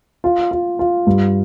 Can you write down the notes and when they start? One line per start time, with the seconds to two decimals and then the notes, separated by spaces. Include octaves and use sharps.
0.24 F4
0.51 F4
0.79 F4
1.07 G2